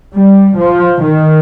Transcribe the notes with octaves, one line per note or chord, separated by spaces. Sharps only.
G3
F3
D#3